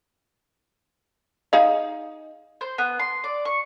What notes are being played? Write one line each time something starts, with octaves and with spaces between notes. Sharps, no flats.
D#4 G#4 F5
C5
B3
C6
D5
C#6